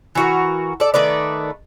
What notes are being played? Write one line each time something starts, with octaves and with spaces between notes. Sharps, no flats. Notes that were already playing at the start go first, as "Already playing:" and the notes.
E3 F#4 A#4
A4 D5
D#3 A3 B4 D5